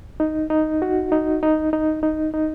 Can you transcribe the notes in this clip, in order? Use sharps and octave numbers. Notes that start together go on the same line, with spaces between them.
D#4
D#4
F#4
D#4
D#4
D#4
D#4
D#4